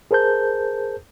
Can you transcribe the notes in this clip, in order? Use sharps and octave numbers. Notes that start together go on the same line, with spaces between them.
G#4 A#4 C5 A5 G6